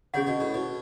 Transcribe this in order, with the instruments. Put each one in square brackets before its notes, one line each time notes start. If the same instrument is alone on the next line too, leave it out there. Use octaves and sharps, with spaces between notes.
[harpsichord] C#3 [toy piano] C#4 G#4 C#5 F#5
[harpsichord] B2
A2
B2